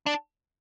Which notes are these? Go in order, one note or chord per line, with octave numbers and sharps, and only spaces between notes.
D4